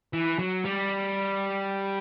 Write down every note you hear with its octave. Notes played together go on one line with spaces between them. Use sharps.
E3
F#3
G3